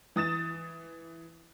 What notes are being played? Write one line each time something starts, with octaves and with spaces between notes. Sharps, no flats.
E3 D#6 A6 E7